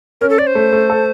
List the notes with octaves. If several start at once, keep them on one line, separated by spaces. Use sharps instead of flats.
C#4 A#4
A4
C#4 D5
C5
A3
A3
A4